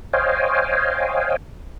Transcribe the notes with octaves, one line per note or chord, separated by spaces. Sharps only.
C5 C#5 D#5 F5 G5 G#5